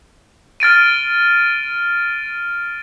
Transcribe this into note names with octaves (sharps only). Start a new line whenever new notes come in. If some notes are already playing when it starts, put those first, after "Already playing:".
F6 A6 D7 D#7